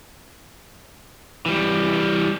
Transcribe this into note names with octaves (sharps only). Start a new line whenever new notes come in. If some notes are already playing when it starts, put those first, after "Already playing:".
E3 G3